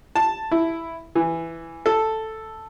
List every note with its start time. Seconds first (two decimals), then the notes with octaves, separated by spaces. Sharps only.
0.16 A5
0.51 E4
1.15 E3
1.86 A4